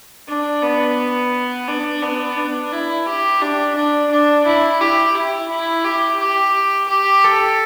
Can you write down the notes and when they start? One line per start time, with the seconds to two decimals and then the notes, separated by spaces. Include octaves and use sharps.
0.28 D4
0.63 B3
1.68 D4
2.03 B3
2.37 D4
2.72 E4
3.06 G4
3.41 D4
3.76 D4
4.12 D4
4.46 E4
4.81 G4
5.15 E4
5.50 E4
5.85 G4
6.20 G4
6.89 G4
7.24 A4